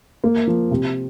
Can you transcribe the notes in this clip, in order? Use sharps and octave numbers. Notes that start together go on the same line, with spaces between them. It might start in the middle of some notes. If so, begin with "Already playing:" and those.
A#3
F3
C3